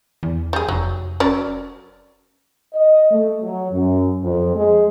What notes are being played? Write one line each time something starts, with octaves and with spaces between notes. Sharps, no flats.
E2
G3 G#4
F1 F#3
F#3 C#4 D5
D#5
A3
F#3
F#2
F2
G#3